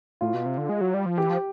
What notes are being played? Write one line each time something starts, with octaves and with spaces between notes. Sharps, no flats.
A2 F4
B2
C3
D3
G#3
F#3
G3
F3
E3 G4
F3